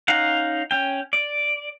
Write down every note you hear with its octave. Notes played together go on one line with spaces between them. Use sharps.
C#4 D#4 F5 F#5
C#4 G5
D5